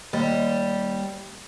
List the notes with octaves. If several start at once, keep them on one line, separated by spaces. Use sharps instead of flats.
D#2 G3